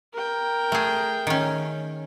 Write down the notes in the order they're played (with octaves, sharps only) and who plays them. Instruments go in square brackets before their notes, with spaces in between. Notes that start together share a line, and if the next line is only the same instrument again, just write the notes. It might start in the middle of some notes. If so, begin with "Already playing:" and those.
[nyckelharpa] A#4 G5
[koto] A3 G#4
D#3 C#4